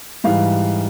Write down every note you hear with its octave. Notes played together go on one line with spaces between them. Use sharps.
G#2 E3 G3 F5